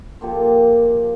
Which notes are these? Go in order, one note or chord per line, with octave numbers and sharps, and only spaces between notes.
F3 A#3 G4 A4